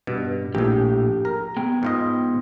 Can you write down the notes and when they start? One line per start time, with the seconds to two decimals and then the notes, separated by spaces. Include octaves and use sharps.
0.07 G2 B2
0.55 A#1 A2 G4 G#4
1.25 A#4
1.57 B3 G#4 G5
1.83 G#2 F4 D#5